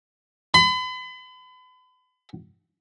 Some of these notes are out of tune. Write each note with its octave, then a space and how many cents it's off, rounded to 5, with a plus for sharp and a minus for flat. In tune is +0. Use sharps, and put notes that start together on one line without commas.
B5 +40